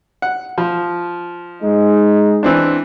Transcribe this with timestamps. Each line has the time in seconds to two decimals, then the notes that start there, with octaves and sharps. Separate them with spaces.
0.22 F#5
0.58 F3
1.63 G#3 D#4
2.43 E3 C4 D4